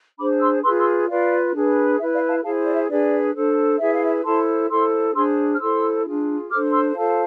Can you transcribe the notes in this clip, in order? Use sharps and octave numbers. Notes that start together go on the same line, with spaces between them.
D4 G#4 C5 B5 D6
C6 E6
F4 G#4 B4 C6 E6
C6 E6
F4 B4 D5 F5
D4 G#4 B4
E4 B4 E5
D5 F5
F5 A5
E4 G#4 C5 F5 A5
D5
E5
D4 G#4 B4 D5
D4 A4 C5
E4 G#4 B4 E5
F5
E5
E4 A4 C5 A5 C6
E4 A4 C5 C6 E6
D4 G#4 C5 C6 E6
F6
E4 A4 C5 C6 E6
D4 F4 G#4
D4 A4 C5 D6 F6
C6 E6
F4 A4 C5 F5 A5